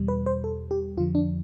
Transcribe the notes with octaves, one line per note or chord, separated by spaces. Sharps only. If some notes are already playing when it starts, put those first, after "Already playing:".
Already playing: E2 B2 G3
B4
C5
A4
G4
F2 D3 F3 F4
D4